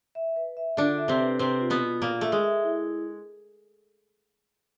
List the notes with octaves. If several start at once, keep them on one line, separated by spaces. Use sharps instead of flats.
E5
B4
E5
D3 D4 F4
E5
C3 C4
B4
C3 C4 B4
F4
B2 B3
F4
A#2 A#3 F4
A3 E5
G#3
E5
E4